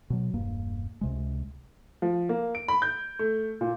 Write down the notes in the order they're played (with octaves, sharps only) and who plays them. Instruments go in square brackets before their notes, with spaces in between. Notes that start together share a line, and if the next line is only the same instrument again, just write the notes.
[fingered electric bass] B2 F#3
E1 G2 A#3
C#2 C3 G#3
[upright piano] F3
A#3
D7
B5
G6
A3
A#2